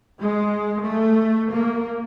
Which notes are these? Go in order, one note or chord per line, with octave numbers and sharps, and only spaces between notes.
G#3
A3
A#3